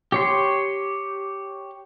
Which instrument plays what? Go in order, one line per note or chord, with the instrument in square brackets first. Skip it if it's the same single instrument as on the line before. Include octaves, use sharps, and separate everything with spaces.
[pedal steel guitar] G4 C#5 C6